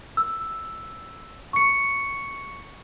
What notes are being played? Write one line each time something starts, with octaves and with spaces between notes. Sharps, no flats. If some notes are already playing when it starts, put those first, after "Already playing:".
E6
C#6 C#7